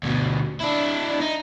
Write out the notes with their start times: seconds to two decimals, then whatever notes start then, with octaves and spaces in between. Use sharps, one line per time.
0.03 D2 B2
0.60 D4 E4
1.21 D#4